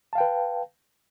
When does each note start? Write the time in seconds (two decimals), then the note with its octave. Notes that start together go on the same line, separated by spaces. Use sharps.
0.13 A5
0.15 F5
0.18 G5
0.21 B4